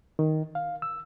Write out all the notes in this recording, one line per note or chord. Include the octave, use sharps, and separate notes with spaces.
D#3
F5
E6